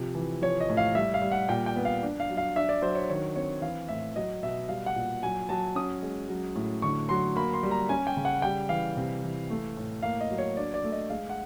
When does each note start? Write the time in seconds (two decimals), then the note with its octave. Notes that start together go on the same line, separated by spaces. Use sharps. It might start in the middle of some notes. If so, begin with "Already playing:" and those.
Already playing: C3 F3
0.15 E3
0.42 F3 C#5
0.61 D#5
0.69 A2
0.77 F5
0.95 G3 E5
1.14 F5
1.22 G3
1.32 F#5
1.49 A#2 G5
1.66 G5
1.76 B3
1.85 F5
2.03 D4
2.20 F5
2.30 F#3
2.37 F5
2.56 D4 E5
2.69 D5
2.82 F#3 C5
2.95 C#5
3.10 D#3 C#5
3.36 C4 C#5
3.62 E3 F5
3.89 A2 E5
4.16 F#3 D#5
4.43 B2 E5
4.69 G3 F5
4.86 F#5
4.95 A#2
5.23 F#3 G#5
5.49 F#3 A5
5.75 C#4 D#6
6.02 G#3
6.29 F#3
6.55 A2
6.82 D3 C#6
7.09 F#3 C6
7.36 A#3 B5
7.54 C6
7.63 G3
7.71 A#5
7.89 C#4 G#5
8.07 G5
8.17 C#3
8.25 F#5
8.42 G3 G5
8.69 E3 F5
8.97 C3
9.24 E3
9.50 A3
9.77 A2
10.02 A#3 F5
10.21 D#5
10.30 F#3
10.38 C#5
10.57 D4 D5
10.74 D5
10.84 A3
10.92 D#5
11.10 G#3 F5
11.29 F#5